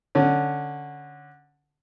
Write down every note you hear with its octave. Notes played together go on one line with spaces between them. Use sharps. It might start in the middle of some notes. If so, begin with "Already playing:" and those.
D3 C#4